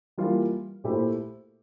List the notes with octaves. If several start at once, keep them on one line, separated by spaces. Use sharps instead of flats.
E3 G3 A#3 F4
A#2 A3 E4 G4 C5